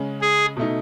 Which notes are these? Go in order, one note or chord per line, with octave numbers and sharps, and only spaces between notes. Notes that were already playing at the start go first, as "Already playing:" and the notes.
Already playing: C#3 G#3 C#4
G#4
B2 A3 D#4